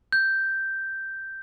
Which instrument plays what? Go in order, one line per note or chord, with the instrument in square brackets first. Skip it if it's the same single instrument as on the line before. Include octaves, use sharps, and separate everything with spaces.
[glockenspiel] G6